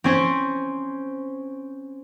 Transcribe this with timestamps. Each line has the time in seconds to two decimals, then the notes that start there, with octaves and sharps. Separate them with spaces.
0.04 C4 C#4 C5